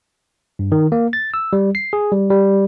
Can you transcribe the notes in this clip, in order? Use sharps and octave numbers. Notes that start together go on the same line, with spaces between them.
G2
D#3
A#3
A6
E6
G3
C7
G#4
G3
G3